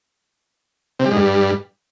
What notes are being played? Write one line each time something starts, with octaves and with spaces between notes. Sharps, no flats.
C3
G3
G#2
G2